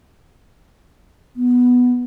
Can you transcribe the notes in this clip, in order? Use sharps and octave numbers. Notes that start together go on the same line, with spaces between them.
B3